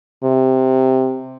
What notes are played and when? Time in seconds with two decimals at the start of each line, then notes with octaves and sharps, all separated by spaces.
0.24 C3